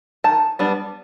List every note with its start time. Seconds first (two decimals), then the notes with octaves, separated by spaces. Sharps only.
0.24 D#3 A5
0.59 G3 B3 D4